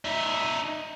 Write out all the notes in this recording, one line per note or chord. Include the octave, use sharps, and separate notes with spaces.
D#4 E5